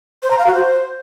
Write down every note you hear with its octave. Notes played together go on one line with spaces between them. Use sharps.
C5
A#5
F5
F#4
C5